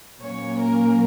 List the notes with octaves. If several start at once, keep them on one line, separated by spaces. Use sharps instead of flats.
A#2 F#3 A#3 C#4 C#5
A#4